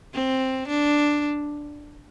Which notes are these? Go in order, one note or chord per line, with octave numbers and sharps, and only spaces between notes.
C4
D4